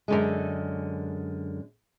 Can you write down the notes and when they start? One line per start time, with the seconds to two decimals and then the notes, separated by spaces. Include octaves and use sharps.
0.08 F#2 D3 G#3